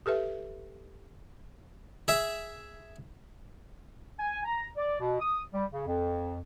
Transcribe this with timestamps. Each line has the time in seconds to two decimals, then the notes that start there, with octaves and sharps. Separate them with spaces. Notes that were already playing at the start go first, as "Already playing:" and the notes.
0.06 G4 A4 B4 E5
2.08 G#4 E5
4.19 G#5
4.45 A#5
4.77 D5
5.00 B2
5.20 D#6
5.53 G3
5.72 C#3
5.86 F2